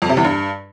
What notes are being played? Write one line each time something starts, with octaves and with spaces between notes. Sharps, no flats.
F2
C3
E2
G2